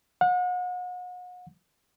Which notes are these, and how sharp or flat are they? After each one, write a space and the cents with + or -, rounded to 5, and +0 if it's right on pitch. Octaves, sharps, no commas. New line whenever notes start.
F#5 -40